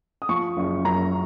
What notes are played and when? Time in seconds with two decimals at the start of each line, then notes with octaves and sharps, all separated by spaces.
0.22 D#6
0.29 F3 C#6
0.57 F#1
0.85 F#2 A#5